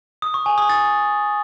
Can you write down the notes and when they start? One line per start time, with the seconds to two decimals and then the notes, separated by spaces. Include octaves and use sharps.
0.22 D#6
0.34 C#6
0.46 G#5
0.58 D#6
0.69 A6